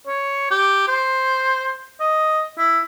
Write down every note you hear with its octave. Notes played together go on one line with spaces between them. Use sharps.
C#5
G4
C5
D#5
E4